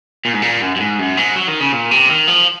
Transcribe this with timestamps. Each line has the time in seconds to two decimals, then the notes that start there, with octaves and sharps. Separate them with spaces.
0.25 A#2
0.34 G#2
0.42 A#2
0.62 F#2
0.76 F#2
0.80 G#2
0.99 F#2
1.17 G#2
1.36 F#3
1.48 D#3
1.60 C#3
1.72 A#2
1.91 C3
2.10 D#3
2.28 F3